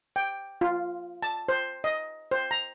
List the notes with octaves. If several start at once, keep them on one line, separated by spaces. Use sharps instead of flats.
G5
F4
A5
C5
D#5
C5
A#5